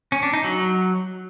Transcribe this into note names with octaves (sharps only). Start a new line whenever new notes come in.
C#4
D4
D#4
F#3